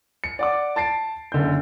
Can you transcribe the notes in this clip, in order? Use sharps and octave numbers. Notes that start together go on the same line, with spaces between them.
C#7
D5 F#5 D6
A5 A6 C7 D7
F#1 D3 G6